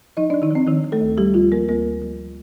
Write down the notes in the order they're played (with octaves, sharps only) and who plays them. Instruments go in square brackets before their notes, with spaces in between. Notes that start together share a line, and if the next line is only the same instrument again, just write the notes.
[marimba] F3 D#4 D#5
D4 D5
F3
D#3 D#4
F3 C4
D#3 F3 D#4
F3
A3 A4
D2
F3 G3 G4
D2 F3 F4
F3 A#3 A#4
D2 A#3 A#4
D2
F3